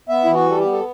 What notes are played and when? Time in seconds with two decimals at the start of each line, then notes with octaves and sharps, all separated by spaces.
0.09 B3 E5
0.24 E3 E4
0.34 F#4
0.46 G3 A4
0.58 G4
0.64 B3
0.72 A4